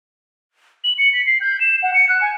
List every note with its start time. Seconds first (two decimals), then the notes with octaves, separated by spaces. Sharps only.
0.84 F#7
0.98 C#7
1.13 B6
1.26 C7
1.41 G6
1.60 E7
1.82 F#5
1.94 C#7
2.09 F#6
2.21 G#5